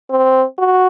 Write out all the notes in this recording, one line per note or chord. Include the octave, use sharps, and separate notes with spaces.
C4
F#4